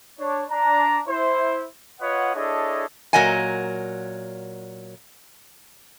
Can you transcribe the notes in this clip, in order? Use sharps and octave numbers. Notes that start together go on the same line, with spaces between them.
D4 C#5
D4 A#5
E4 C5
F4 B4 C#5 D#5 F#5
D4 E4 G#4 A4 C#5 D#5
A#2 F#3 A#4 D#5 F#5 G#5